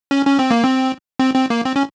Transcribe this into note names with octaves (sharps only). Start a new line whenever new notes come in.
C#4
C#4
C4
A#3
C4
C4
C4
A#3
C4
C#4